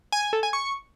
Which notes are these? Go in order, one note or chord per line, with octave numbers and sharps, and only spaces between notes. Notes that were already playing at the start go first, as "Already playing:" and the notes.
G#5
G#5
A4
G#5
C#6